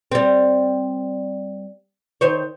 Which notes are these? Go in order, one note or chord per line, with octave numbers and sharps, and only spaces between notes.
G3 C4
D#3 C5 C#5